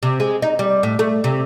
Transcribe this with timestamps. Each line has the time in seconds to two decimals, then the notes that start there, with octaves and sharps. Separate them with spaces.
0.03 C3
0.20 G#3
0.42 D#4
0.59 G3
0.83 A2
0.99 A3
1.24 C3